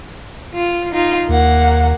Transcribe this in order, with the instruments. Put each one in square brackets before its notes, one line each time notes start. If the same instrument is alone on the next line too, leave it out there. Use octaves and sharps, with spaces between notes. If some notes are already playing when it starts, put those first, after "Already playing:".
[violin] F4
D#4 F4
[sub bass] D#2 [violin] A#3 F#5